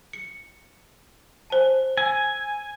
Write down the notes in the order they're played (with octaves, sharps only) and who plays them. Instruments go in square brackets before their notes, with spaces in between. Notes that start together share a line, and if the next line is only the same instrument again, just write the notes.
[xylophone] C#7
C5 G#5 A5
[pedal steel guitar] G#5 [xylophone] E6